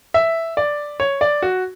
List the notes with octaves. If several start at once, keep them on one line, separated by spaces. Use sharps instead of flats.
E5
D5
C#5
D5
F#4